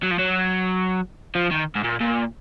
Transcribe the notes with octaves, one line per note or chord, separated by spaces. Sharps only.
F#3
F3
F#3
F3
D#3
G#2
A#2
A#2